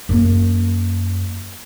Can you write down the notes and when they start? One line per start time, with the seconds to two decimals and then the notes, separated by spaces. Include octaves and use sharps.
0.09 F#2 A#3